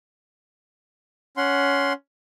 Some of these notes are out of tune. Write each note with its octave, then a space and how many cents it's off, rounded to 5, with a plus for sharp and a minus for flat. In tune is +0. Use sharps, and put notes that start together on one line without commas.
C#4 +15 F#5 +0 C6 +0